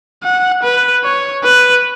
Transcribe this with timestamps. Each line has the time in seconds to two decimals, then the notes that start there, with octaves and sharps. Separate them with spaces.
0.24 F#5
0.63 B4
1.04 C#5
1.44 B4